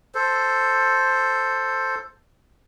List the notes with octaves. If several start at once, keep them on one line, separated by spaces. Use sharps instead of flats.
A4 C5